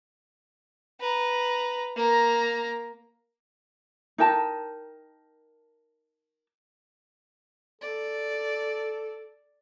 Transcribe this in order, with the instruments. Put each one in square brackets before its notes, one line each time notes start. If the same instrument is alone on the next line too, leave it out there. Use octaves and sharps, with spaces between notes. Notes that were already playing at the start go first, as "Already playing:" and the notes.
[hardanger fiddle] B4 A#5
A#3 A#5
[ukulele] D#4 A#4 G5 A5
[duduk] A4 [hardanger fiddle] D5